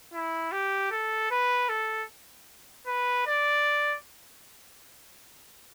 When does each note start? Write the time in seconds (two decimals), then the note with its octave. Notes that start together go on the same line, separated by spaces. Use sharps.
0.14 E4
0.52 G4
0.91 A4
1.31 B4
1.69 A4
2.87 B4
3.26 D5